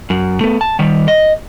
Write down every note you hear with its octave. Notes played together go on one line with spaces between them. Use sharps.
F#2
A3 B3
A5
D#3 G3
D#5